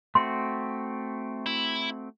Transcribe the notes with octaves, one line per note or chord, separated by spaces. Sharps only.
A3 C4 F#4 C6
E4